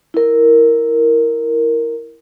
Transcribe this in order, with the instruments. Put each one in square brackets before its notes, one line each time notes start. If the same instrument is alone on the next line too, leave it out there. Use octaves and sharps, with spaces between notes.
[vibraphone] E4 A#4